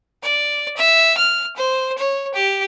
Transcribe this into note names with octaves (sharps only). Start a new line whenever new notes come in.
D5
E5
F6
C5
C#5
G4